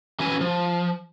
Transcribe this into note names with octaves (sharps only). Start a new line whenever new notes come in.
E3 C#4 F#4 B4 G#5
F3